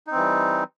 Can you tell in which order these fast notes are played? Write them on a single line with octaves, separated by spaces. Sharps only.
D#4 C4 E3 G3